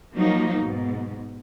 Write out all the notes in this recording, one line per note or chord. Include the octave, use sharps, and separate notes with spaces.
F3 F#3 A#3 D#4
G#2 B2